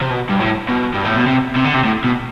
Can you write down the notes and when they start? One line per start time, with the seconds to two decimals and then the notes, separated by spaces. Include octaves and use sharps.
0.02 C3
0.11 B2
0.29 G2
0.40 A2
0.68 B2
0.94 G2
1.05 A2
1.16 B2
1.27 C3
1.56 C3
1.65 D3
1.75 C3
1.85 A2
2.04 B2